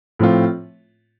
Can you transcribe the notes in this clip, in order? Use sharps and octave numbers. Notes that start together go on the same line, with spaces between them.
A2 F3 C4 F4